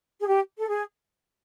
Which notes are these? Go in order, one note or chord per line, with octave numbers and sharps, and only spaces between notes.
G#4
G4
A4
G#4